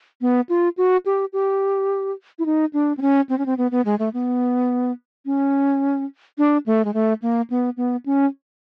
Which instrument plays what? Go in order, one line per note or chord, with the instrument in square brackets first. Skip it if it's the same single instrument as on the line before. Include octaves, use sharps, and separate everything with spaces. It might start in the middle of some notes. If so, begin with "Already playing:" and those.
[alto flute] B3
F4
F#4
G4
G4
E4
D#4
D4
C4
C#4
C4
C#4
C4
B3
B3
G#3
A3
B3
C#4
D4
A3
G#3
A3
A#3
B3
B3
C#4